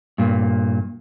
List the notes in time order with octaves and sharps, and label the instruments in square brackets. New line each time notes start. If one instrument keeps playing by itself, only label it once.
[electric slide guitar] G2 A#2